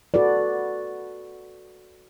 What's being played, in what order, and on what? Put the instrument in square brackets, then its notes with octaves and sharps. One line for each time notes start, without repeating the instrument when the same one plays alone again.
[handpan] F#4 A4 B4 D5